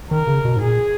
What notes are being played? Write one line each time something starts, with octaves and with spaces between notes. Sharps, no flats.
D#3 A#4
C#3
B2
G#2
A#2 G#4